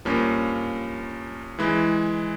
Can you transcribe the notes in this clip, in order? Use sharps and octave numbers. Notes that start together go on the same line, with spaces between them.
G2 F3 A#3 C#4
E3 G#3 E4